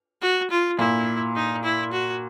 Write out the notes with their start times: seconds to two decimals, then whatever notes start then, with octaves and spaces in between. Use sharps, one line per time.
0.22 F#4
0.50 F4
0.78 A#2 E4
1.36 D#4
1.64 E4
1.92 F#4